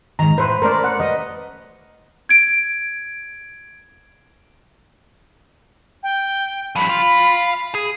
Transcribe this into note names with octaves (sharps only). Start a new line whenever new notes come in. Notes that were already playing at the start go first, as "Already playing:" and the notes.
G#2 D#3 A#5
A2 B4 C5
A3 C#4 A#4 C5 D5
F#5
G3 B4 D#5
G#6 D7
G5
F3 G3 B5
F5 C6
G#4